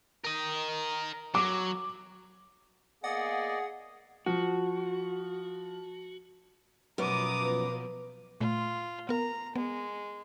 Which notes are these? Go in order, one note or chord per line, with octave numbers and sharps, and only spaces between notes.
A#4 D#5
F#3 D6
A#3 B3 G#4 D5 D#5 F5 F#5
F3 F#4
F#2 B2 F3 B3 A#5 D6 D#6
B4
A#2 A3 F4
B3 A#4 A#5
G#3 B3